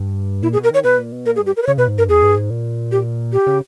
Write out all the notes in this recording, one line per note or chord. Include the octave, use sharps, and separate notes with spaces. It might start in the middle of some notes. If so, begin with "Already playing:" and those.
Already playing: G2
A#2 E4
G#4
B2
A#4
D#3 C#5
B2 B4
A#2
B2
A#2 A#4
G#4
G2
G4
A#4
B4
C#3 C#5
B2 B4
G#2
G2 A#4
E2 G#4
G2
G#2
A#2
G4
G4
C#3